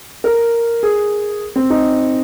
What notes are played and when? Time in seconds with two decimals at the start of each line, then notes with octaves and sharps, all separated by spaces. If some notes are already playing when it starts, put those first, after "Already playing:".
0.24 A#4
0.83 G#4
1.56 C4
1.70 D#4